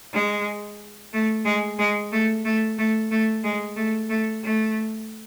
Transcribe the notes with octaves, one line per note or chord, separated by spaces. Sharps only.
G#3
A3
G#3
G#3
A3
A3
A3
A3
G#3
A3
A3
A3